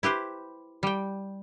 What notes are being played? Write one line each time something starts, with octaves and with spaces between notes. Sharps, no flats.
E4 G4 B4 C5
G3 G5